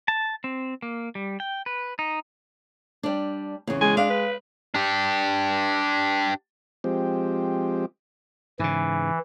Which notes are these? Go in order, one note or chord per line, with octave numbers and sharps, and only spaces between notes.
A5
C4
A#3
G3
G5
B4
D#4
G3 D4
E2 C#3
G#3 G#5
D4 F5
B4
D4 G4
F3 G#3 C4 G4
G#2 C#3 E3